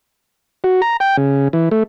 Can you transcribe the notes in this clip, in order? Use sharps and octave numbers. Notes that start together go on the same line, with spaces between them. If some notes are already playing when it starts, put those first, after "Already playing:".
F#4
A#5
G5
C#3
E3
A3